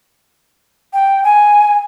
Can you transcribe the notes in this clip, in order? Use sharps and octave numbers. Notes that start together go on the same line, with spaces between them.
G5
G#5